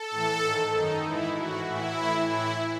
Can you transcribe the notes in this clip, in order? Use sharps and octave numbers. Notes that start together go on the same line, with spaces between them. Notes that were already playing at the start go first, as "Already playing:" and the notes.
Already playing: A4
A2 E3
G#2 D#3
F#2 D#3 D#4
G#2 E3 E4
A2 E3 F#4
A2 E3 E4
A2 E3
A2 E3 E4